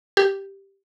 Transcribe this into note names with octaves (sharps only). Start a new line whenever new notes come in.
G4